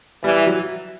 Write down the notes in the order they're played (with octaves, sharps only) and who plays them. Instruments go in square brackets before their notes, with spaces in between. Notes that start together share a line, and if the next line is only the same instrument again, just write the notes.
[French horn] E3 [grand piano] G3
[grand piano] F#3